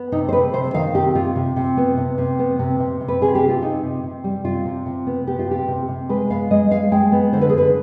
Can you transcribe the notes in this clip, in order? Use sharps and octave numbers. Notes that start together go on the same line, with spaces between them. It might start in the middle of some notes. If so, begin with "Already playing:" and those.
Already playing: B3
C3 D#4
C5
C3 B4
C3 C5
D#3 F5
C3 G4
C3 F4
C3
C3
B3
C3
C3
B3
C3
C3
C3
B4
C3 G#4
G4
C3
F4
C3 D#4
C3
C3
G3
C3 F4
C3
C3
B3
B3 G4
F4
C3 G4
C3
C3
G#3 B4
B3 F5
G#3 D#5
G#3 F5
G#3 G5
B3
D3 C5
B4
G#4
D3 B4